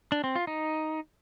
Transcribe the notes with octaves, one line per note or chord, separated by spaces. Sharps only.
D4
C4
F4
D#4